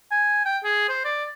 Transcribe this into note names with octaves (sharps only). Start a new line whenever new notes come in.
G#5
G5
G#4
C5
D5